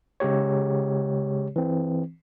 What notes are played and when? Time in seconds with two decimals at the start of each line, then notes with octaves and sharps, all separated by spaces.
0.20 C#3 G#3 G4 C#5
1.56 E3 C4